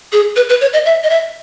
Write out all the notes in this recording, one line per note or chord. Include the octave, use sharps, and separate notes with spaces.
G#4
B4
B4
C#5
D#5
E5
D#5
E5